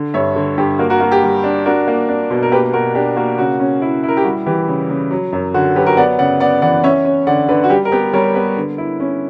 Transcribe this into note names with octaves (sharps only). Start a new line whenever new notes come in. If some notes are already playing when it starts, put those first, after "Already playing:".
Already playing: D3
G2 C#5 E5
D3
G2 G4
A#3 F#4 A#4
F#4 A#4
A#3 F#4
G4
G3
D4
D4 F#4 A#4
A#3
D4
B2
A#4
A#3 G4 B4
B2 F#4 A#4
D4 G4
A#3 F#4
C#3 F#4
C#4
E4
E4
A#4
G4
G3 F#4
E3 G4
C#3
C#3
F#3
F#2
D3 F#4
F#3 G4 B4
F#4 A#4
B3 D5 F#5
C#3 D5 F#5
B3 D5 F#5
E3 D5 F#5
C#4 C#5 E5
C#4
D3 D5 F#5
D3 B4 D5
F#4
G3 G4
A#4
B3 G4 B4
G3 A#4 C#5
B3 G4 B4
D3
E4
C#4